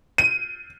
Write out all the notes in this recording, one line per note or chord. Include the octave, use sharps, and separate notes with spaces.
D#7